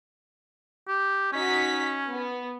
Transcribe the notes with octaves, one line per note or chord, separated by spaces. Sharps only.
G4
C#4 D#4 F#4 B6
B3